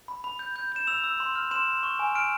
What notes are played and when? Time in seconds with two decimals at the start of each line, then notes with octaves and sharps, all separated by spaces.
0.08 B5
0.24 B5
0.39 G6
0.56 G6
0.72 G6 E7
0.87 E6 F7
1.04 E6
1.20 C6
1.35 F6
1.51 C6 E7
1.68 C6
1.83 C#6
1.99 G#5
2.15 F6 D7